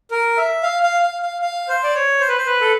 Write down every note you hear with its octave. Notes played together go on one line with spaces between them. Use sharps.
A#4
E5
F5
F5
F5
F5
F5
C5
D5
C#5
C5
B4
C5
B4
A4